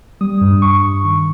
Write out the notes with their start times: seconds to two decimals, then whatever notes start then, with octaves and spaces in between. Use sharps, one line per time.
0.21 G3 D#6
0.41 G2
0.62 G2 C#6
0.83 G2
1.04 D#3